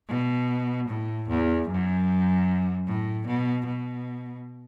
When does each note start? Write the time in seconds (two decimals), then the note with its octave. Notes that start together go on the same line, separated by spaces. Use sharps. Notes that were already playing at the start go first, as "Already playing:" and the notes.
0.08 B2
0.88 A2
1.28 E2
1.68 F#2
2.87 A2
3.27 B2
3.66 B2